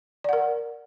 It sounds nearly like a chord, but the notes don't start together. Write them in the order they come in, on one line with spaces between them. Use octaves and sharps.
D5 F#5 A#4